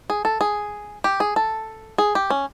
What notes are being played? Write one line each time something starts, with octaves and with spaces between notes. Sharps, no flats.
G#4
A4
G#4
G4
G#4
A4
G#4
G4
C#4